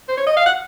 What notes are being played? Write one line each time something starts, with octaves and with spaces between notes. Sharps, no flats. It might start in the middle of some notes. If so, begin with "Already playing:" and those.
C5
C#5
D#5
F5
F#5